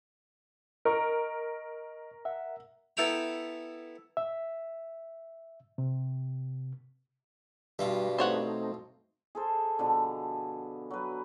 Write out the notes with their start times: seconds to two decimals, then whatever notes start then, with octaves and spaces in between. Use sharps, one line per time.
0.85 A#4 D#5 C#6
2.25 E5 F#5
2.97 B3 E4 A4 G5 A#5 B5
4.17 E5
5.78 C3
7.79 G2 B2 G3 F4 E5
8.18 A3 C4 D#4 C5 C#5 F#5
9.35 G#4 A4 C5
9.79 B2 D3 F3
10.90 F#3 B4